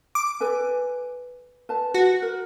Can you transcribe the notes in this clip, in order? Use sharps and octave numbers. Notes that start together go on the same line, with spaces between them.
D6
A4 B4 G#5
B4 A5
F#4
A#4